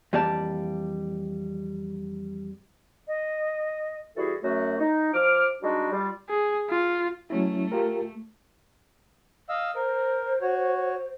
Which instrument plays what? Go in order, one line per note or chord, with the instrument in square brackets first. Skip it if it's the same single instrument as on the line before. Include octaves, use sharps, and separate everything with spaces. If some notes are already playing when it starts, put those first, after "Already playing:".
[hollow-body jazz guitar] F2 E3 G3 A#3 D5 A5
[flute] D#5
[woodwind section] E3 G3 E4 F#4 G#4 A4
F#2 A3 F#4
D#4
F3 D6 F6
G3 G#3 D4 D#4 F#4
G3 F4
[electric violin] G#4
F4
[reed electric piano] F#3 C#4 E4 [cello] A3
[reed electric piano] F4 G4 A#4
[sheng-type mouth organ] D#5 F5 E6
[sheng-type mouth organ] A#4 [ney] C5
[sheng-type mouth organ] F#4 C#5